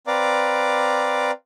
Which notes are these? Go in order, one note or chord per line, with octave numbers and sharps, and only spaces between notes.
C4 B4 D5 F5 A#5 D6